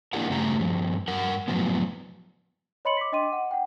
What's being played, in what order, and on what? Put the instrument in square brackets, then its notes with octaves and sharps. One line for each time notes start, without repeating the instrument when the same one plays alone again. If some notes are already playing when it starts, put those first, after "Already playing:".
[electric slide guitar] A#3 D4 E4 G4 A#4 F#5
G2 C#3 A3 C#4 G4 A#5
G2 F3
G2 A#4 F#5
F#2 A2 F3 F#3 B3
[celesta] C#5 D#5 B5 C6 C#7 F#7
D6 B6
D4 D#5 G5 C6 D6 D#7
F#5
F#5 G5